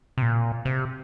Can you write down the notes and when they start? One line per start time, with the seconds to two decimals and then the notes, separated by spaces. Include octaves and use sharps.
0.18 C3
0.22 A#2
0.65 C3